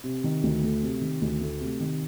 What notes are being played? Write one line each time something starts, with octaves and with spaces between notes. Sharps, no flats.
C3
D#3
D2
A3
C3
D#3
D2
A3
C3
D#3